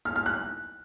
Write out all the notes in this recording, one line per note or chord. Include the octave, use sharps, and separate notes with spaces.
F6
F6
F#6